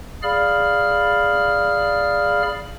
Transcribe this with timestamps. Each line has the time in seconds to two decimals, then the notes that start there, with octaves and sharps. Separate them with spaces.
0.23 G#4 D5 F5 B5 F6